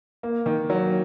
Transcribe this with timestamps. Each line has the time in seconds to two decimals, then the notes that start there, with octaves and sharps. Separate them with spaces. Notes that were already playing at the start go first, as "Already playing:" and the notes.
0.23 A#3
0.46 D#3
0.70 F#3